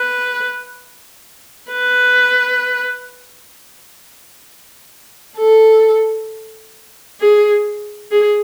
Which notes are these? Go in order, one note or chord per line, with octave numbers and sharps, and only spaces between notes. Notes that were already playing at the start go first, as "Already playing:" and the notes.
Already playing: B4
B4
A4
G#4
G#4